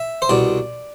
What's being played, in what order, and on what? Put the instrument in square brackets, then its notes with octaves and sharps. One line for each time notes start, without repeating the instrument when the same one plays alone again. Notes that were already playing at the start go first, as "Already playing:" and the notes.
Already playing: [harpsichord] E5
C5
C2 B2 D5